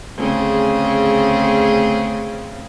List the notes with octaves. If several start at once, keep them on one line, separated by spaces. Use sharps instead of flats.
D2 C#3 C4 G#4